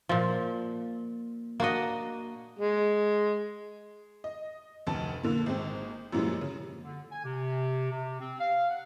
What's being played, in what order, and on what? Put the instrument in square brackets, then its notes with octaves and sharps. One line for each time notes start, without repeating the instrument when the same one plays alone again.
[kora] A#2 F3
A#3 D4 F#4 D#5
[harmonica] G#3
[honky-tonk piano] D#5
F1 D2 A5
A#2 D3 A#3
G#1 G#3 C4
F#2 A#2 E3 F3 G3 G#3
C#3
[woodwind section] D3
G#5
C3
C3
C4
F5
F#5